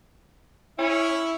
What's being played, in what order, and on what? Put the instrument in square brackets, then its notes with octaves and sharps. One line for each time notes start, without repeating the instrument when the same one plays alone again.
[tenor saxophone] C#4 [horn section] E4